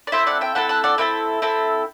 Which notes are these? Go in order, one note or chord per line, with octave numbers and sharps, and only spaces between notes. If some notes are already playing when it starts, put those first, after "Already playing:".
D5
C4 E4 A4 C5 E5
D5 F#5
E5 G5
C4 E4 A4 F#5 A5
F#5 A5
D5 F#5
C4 E4 A4 B4
C4 E4 A4